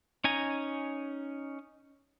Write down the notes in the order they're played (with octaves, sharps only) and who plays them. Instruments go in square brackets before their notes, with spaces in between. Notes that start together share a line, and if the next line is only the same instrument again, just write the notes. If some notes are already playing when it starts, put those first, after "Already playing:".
[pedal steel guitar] C#4 D#4 G#5 A#5